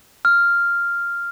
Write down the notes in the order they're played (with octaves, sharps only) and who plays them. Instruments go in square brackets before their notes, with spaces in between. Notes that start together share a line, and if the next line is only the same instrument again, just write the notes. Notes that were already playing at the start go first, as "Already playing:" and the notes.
[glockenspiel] F6